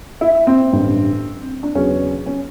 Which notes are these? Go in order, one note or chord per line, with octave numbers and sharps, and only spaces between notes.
E4
C4
A1 G2 D3
D4
E2 C#3 F#3 B3 C#4
C#4